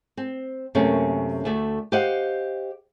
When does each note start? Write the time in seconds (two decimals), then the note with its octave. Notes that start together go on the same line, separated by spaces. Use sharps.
0.17 C4
0.75 F#2 C3 A3 A#3 C#4
1.45 D2 A3 D5
1.92 G4 C5 D#5 F5 F#5